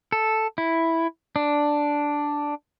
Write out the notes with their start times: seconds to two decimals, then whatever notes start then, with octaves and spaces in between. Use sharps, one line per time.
0.12 A4
0.58 E4
1.36 D4